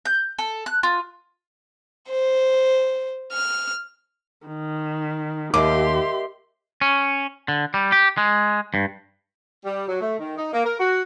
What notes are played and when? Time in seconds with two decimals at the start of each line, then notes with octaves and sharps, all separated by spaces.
0.05 G6
0.38 A4
0.66 F#6
0.83 F4
2.10 C5
3.34 F6
4.47 D#3
5.54 D#2 G4 A#4 D#5 E5 C6 D6
6.81 C#4
7.48 D3
7.74 G3
7.92 G4
8.18 G#3
8.74 G2
9.65 G3
9.88 F#3
10.01 A3
10.20 D#3
10.37 D#4
10.53 A#3
10.65 A#4
10.79 F#4